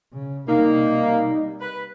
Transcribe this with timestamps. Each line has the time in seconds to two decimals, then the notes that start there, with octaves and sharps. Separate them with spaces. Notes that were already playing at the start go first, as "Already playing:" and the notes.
0.13 C#3
0.48 C3 G3 A#3 D#4
1.61 B4